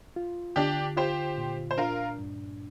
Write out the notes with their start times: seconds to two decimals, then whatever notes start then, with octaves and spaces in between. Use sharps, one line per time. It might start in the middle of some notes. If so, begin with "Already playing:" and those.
0.16 F4
0.56 D3 D4 G4
0.97 F4 G4 C5
1.38 A#2
1.71 C5
1.78 D4 F4 A#4
2.19 G2